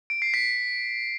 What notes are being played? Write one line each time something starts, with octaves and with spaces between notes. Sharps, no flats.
D7
C7
B6